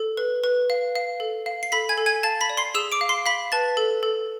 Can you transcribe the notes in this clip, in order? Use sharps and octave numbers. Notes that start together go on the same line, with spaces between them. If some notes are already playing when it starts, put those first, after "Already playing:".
Already playing: A4
B4
B4
F5
F5
A4
F5
C7
A4 B5 B6
G#5 G#6
A4
G#5 G#6
F5 A5 A6
B5 B6
D5
C6 C7
G#4 E6 E7
D6 D7
F5
C6 C7
F5 B5 B6
B4 A5 A6
A4
A4